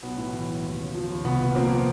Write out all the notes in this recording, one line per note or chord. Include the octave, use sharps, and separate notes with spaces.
B1 B3
A2
E3
B1
D#2
C#3
F3
D#2
C2 B3
A#2
F3 A#3 C4